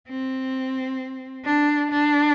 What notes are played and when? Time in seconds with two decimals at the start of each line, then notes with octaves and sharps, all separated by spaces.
0.09 C4
1.45 D4
1.92 D4